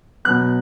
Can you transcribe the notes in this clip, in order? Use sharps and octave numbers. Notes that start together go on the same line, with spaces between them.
B2 F#3 B3 F#6